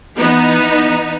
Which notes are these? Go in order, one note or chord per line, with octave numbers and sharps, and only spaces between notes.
E3 B3 D#4